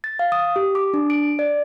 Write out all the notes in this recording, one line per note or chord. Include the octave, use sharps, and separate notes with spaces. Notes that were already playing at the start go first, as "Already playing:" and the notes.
A6
F5
D#6
G4
D6
D4
D7
D5